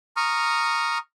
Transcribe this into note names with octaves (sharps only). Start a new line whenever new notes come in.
A#5 C#6 D#6 F6